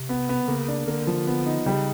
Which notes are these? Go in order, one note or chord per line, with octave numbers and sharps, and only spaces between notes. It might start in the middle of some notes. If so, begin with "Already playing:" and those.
Already playing: C3
B3
B3
C#3 A#3
D4
D3 A#3
F3
B3
D#4
C#3 G3